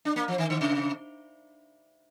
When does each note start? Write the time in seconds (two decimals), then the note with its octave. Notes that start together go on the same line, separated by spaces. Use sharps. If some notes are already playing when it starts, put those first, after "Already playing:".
0.05 D4
0.16 A#3
0.28 F3
0.38 D#3
0.50 D3
0.61 C3